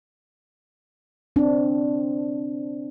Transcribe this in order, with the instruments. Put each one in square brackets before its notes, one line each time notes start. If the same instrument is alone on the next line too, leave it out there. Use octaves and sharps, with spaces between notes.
[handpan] C4 D4